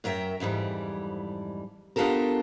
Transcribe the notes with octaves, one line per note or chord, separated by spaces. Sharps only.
F#2 F#3 A#4 E5 G5
F2 G#2 E3 G3
B3 D4 F4 G4 A4 A#4